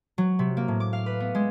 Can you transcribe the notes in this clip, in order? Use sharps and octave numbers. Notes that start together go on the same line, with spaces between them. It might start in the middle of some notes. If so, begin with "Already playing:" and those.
F#3
C3
A#3
A2
D6
F5
B4
B3
G#3